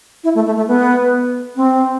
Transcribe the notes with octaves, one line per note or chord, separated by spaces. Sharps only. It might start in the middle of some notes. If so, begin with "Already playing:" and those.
E4
A3
A3
A3
B3
C4